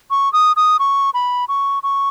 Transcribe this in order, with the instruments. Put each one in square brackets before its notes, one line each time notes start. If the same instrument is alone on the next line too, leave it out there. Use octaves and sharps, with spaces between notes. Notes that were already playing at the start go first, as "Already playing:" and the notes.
[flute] C#6
D#6
D#6
C#6
B5
C#6
C#6